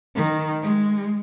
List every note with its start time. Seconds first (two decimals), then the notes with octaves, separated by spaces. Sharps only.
0.14 D#3
0.61 G#3